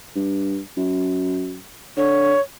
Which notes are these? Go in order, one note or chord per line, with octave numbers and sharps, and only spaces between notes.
G2
F#2
D3 C#5